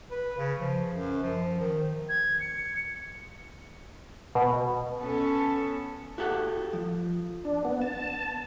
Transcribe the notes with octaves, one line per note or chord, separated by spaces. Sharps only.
B4
C#3
F3
F#2
F3
D#3
G#6
C#7
B2
B3 C#4 A4
F#4 G4 A4 F#5
F3
D4
B3
A5